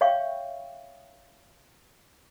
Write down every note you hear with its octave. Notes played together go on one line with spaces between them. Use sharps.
C#5 E5 F5 G5 C#6